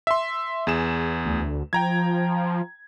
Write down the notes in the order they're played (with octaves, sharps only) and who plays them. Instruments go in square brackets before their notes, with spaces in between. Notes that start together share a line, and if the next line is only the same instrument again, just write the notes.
[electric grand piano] E5 C6
E2 G#4 E7
[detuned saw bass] D2
[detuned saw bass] F3 [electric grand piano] G5 A#5 G#6